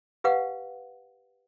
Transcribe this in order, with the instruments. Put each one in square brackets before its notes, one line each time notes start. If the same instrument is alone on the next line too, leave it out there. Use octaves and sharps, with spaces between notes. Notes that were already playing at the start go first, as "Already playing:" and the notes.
[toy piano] G4 B4 F5 F#5